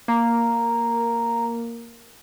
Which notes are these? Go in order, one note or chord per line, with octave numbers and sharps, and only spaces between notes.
A#3 A#5